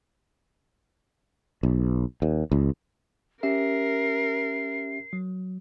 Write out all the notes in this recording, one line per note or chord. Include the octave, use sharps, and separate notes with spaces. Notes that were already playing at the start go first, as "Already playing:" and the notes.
B1
D#2
C#2
C#4 G4 A#4 E5 C7
F#3